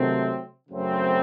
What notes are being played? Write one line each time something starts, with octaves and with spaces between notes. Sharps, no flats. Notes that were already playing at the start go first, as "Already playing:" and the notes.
Already playing: C3 D#3 F#3 A3 C4
F#2 C#3 F#3 A3 C4